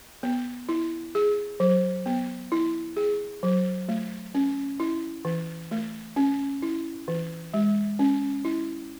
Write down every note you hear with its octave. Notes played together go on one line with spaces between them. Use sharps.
B3
E4
G#4
F#3
B3
E4
G#4
F#3
A3
C#4
E4
E3
A3
C#4
E4
E3
G#3
C#4
E4